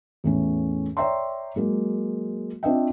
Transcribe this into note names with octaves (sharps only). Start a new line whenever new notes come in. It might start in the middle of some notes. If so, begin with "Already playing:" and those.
E2 A2 C#4
C#5 D5 E5 G5 A#5 C6
F#3 G#3 A#3
C4 D4 F4 D#5 E5 G5